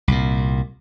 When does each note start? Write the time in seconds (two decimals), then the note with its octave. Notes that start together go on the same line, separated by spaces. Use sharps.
0.08 C2 A#2